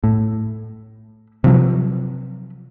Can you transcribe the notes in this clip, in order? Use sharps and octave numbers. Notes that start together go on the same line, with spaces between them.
A2
C3 F3 F#3